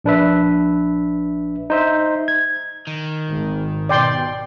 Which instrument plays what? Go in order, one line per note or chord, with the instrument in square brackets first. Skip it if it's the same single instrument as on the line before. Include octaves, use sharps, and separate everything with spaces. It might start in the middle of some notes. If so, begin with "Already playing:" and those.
[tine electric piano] A#1 D4 B4 E5
D#4 C5 E5
G#6
[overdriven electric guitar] D#3
[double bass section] G#1
[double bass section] B2 [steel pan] D5 G5 C6